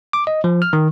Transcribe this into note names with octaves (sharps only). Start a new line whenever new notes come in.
D6
D#5
F3
F6
D#3